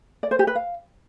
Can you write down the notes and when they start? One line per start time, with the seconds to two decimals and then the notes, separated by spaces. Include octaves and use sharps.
0.23 D5
0.31 C5
0.39 G4
0.47 B4
0.55 F5